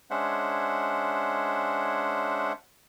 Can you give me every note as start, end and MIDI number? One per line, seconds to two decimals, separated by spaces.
0.11 2.52 56
0.11 2.52 61
0.11 2.52 62
0.11 2.52 72
0.11 2.52 76
0.11 2.52 78